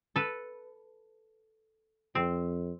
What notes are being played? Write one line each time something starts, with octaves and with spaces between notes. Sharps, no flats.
A4 B4
F2 C4